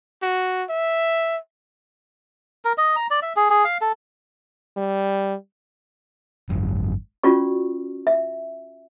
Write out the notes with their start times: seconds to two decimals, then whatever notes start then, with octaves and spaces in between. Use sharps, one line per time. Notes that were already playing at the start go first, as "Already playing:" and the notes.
0.22 F#4
0.69 E5
2.65 A#4
2.78 D#5
2.96 A#5
3.11 D5
3.22 E5
3.36 G#4
3.50 G#4
3.65 F5
3.81 A4
4.77 G3
6.50 G#1 F#2
7.23 C#4 F4 F#4 D5 C#6
8.07 E5